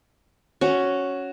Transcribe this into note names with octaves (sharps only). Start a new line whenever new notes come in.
C#4 F#4